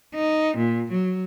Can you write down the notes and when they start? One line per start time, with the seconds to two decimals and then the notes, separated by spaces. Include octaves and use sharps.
0.14 D#4
0.57 A#2
0.90 F#3